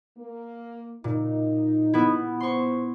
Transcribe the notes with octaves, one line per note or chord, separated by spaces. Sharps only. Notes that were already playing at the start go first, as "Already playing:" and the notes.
A#3
A#2 D#4
B3 E4
C5 C6 C#6